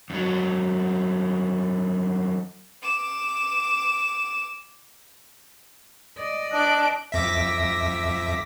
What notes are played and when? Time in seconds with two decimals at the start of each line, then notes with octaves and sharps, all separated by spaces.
0.10 F2 F#3
2.83 D6 E7
6.18 D5 D#5
6.53 D4 F#6 D7
7.12 F2 E5 D6 A#6 B6